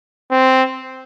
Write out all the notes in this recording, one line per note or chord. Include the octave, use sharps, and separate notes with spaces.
C4